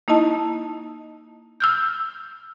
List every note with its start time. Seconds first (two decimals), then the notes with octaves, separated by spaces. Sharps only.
0.08 A#3 D#4 E4 D#5 A5
1.60 E6 F6 G6